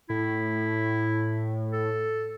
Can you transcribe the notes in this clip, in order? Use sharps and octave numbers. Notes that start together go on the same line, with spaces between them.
A2 E4
A4